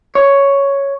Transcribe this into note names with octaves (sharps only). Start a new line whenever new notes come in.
C#5